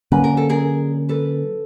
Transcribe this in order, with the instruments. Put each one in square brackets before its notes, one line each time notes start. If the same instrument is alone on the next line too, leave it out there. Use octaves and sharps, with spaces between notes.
[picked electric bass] D3 F#3 A#3 C#4 [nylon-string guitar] B4
[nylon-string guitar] A#4
A4
G#4 A#4
A4 B4